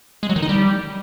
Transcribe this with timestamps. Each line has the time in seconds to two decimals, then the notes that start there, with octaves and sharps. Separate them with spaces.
0.23 G#3
0.29 F#3
0.36 D#3
0.42 D#4
0.49 G3